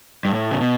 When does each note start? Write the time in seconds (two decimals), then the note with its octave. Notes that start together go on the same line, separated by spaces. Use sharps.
0.25 G2
0.34 A2
0.51 C#3
0.60 B2